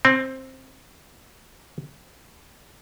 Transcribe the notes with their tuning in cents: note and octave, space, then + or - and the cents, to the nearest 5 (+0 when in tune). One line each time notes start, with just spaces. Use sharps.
C4 +10